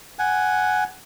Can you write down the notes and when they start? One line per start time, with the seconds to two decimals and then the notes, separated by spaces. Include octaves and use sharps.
0.19 F#5 G#5